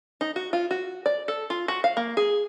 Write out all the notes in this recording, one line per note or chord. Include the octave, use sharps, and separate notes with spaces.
D#4
F#4
F4
F#4
D5
A4
F4
F#4
F5
A#3
G#4